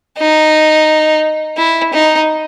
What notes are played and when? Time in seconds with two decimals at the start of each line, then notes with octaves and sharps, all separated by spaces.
0.19 D#4
1.58 E4
1.94 D#4